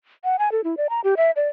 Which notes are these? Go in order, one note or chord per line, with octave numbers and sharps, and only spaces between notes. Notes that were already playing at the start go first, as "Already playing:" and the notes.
F#5
G#5
A4
E4
D5
A#5
G4
E5
D5